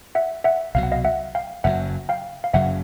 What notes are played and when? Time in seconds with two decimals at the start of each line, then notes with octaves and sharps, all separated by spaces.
0.15 E5 F#5
0.44 E5 F#5
0.75 C2 B2 F#3 F5
0.83 F#5
0.92 D#5 F5
1.05 E5 F#5
1.35 F5 G5
1.64 F#1 F#2 C#3 F#3 E5 F#5
2.09 F5 G5
2.44 F5
2.53 F#1 F#2 C#3 F#3 E5 F#5